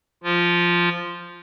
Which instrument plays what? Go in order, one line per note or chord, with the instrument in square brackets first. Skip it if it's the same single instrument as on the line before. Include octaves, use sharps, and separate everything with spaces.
[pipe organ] F3 F4